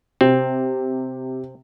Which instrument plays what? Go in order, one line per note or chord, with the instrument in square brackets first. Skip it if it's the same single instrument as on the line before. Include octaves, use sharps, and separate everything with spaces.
[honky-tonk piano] C3 [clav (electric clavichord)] C4